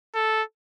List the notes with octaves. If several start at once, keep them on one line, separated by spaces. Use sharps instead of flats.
A4